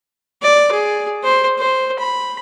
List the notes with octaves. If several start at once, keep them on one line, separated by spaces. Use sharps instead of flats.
D5
G#4
C5
C5
B5